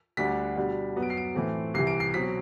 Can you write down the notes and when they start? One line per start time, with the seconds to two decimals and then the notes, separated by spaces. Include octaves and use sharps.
0.17 D2 D3 G3 D4 B6
0.57 B2 G3 D4
0.96 F#2 F#3 B3
1.02 D7
1.10 C7
1.17 D7
1.35 A2 E3 A3 C4
1.74 C2 C3 E3 C7
1.87 D7
2.00 C7
2.14 B2 F#3 C4 B6